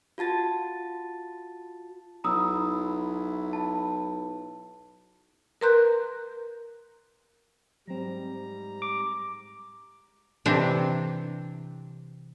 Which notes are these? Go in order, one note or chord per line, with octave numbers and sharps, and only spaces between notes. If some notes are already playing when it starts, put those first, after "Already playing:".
F4 F#4 A5 A6
B1 E4 A#5 D#6 E6
A5
A#4 B4 A#5 C6 F#6 G6
G#2 F#3 G3 C4 A#5
D6
C3 E3 C4 D4